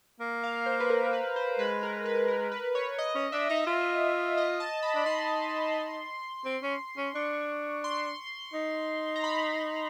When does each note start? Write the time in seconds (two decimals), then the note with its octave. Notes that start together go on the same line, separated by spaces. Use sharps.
0.20 A#3
0.44 F5
0.66 C5
0.80 B4
0.90 A#4
1.13 B4
1.36 C5
1.59 G#3 B4
1.83 A#4
2.06 B4
2.28 A#4
2.52 B4
2.75 C#5
2.98 D#5
3.15 C#4
3.32 D4 E5
3.49 D#4 D#5
3.67 F4
4.37 D#5
4.60 A5
4.83 B5
4.95 D4
5.06 D#4 C6
6.45 C4
6.63 C#4
6.98 C#4
7.15 D4 C#6
7.84 C6
8.54 D#4
9.16 A#5
9.24 B5